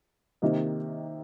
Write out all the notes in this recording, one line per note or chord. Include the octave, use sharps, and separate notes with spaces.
C3 D#3 A#3 D#4